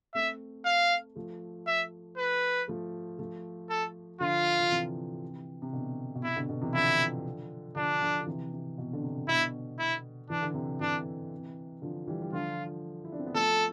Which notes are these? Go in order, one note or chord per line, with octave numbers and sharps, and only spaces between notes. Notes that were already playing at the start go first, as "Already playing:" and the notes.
A3 C4 E5
F5
F3 A3
E5
B4
F3 A3
F3 A3
A4
D3 F3 F4
F3
C3 E3
C3
B2 D3
B2
C3 E4
B2 D3
B2 D3
C3 E3
D3 F3 E4
D3 F3 D4
D3 F3
D3
C3 E3
C3
B2
D3
C3
B2 D3 E4
E4
E3 D4
D3
C3 E3
C3 E3 D4
D3 F3
E3 G3
G3
D3 F3 F4
E4
D4
C4
B3
F3 A3 A4